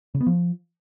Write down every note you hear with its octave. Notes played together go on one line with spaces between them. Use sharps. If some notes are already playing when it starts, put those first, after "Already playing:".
C#3
B3
F3